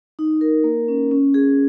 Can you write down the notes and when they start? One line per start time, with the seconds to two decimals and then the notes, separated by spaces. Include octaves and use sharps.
0.19 D#4
0.41 A#4
0.64 A#3
0.88 C#4
1.11 C#4
1.34 G#4